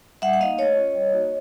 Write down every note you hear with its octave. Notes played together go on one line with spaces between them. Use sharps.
G3 E5 F#5
F#5
A#3 D#4 D#5 F5
A3 C#5 D#5
C#4 F4
G3
A#3 D#4 F#4